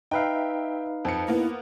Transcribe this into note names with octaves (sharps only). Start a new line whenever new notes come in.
D#4 B4 E5 F5 G5
F2 C#7
A#3 B3 E4